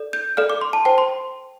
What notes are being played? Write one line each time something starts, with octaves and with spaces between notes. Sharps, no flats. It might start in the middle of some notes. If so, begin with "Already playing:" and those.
Already playing: A4 D5
G6
A4 D5 F5 F6
D6
C6
A5
C5 G5 A5
C6